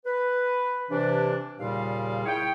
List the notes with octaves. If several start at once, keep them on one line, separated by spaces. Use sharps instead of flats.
B4
C3 E3 D4
D#2 A#2 C#3 G3 F5
E4 G#4 C#5 G5